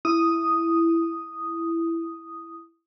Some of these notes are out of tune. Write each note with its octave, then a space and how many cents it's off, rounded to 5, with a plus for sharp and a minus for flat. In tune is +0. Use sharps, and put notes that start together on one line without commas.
E4 +10 D#6 +0